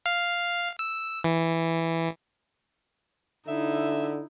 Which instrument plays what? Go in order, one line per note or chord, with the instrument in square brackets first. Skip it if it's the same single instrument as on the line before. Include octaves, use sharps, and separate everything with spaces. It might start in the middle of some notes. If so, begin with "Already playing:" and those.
[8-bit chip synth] F5
E6
E3
[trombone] D3 [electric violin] D#4 E4 [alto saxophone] E5